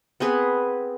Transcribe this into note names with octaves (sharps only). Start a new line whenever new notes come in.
B3 C4 G#4 B4